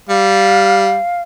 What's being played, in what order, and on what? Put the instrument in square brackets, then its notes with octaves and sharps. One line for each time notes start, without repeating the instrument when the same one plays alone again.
[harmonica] G3 [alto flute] F5